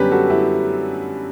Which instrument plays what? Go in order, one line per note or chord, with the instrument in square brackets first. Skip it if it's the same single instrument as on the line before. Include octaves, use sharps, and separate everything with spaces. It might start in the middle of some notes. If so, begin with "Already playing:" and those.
Already playing: [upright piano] F#2 D3 G3 B3 C#4 G4 B4
F#4 A4
E4 G4